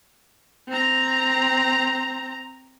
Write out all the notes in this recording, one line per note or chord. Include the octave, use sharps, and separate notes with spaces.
C4 A#5